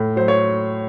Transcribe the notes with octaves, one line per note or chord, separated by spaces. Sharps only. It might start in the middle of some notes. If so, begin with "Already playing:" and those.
Already playing: A2
F#3 C5
C#5